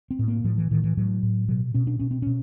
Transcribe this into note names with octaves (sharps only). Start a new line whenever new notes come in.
C4
A2
A#3
A2 F3
E3
A2 D#3
E3
A2 F#3
A2
B2 F#3
B2 C#4
D4
B2 C#4
C4
B2 C#4